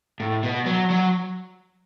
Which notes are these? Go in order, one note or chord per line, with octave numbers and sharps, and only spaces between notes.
A2
B2
F#3
F#3